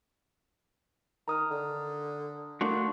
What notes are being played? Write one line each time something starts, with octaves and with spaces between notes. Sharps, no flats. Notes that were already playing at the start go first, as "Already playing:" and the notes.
D#3 A#5 D#6 F6
D3
A3 A#3 D4 F#4 C6 C#6